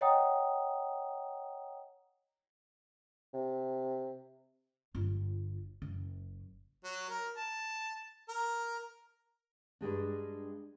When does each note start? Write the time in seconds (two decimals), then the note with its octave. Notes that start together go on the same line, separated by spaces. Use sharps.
0.01 C#5 D#5 F#5 G5 A#5 D#6
3.34 C3
4.95 G1 F4
5.82 F#1
6.84 F#3
7.09 A#4
7.37 A5
8.29 A#4
9.81 G2 G3 G#3 D4